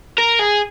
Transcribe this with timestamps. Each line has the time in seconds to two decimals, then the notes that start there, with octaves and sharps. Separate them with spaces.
0.18 A#4
0.39 G#4